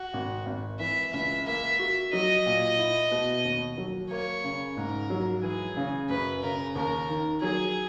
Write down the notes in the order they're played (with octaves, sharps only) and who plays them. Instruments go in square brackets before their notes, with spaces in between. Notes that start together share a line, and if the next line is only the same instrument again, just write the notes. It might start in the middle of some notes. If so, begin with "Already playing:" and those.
Already playing: [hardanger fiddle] F#4
[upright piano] G#1
G#1
[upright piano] E3 [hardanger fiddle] E5
[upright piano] C#2 [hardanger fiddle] E5
[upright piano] A#3 [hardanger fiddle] E5
[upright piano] F#4
[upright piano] F#3 [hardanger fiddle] D#5
[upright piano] A#2
E4
B2
D#2
F#3
[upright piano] A#3 [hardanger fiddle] C#5
[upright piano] C#3
[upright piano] G#2 [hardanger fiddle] A#4
[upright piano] F#3
[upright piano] E3 [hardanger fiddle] G#4
[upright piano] C#3
[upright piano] F#2 [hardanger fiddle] B4
[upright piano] C#3 [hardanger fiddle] A#4
[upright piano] D#2 [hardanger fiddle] A#4
[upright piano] D#3
[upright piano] F#3 [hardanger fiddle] G#4